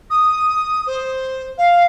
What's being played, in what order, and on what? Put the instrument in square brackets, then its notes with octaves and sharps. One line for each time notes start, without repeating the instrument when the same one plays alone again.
[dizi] D#6
C5
F5